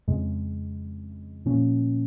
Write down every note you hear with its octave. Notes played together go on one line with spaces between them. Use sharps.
F2 C#3 G#3
A#2 F3 A#3 C#4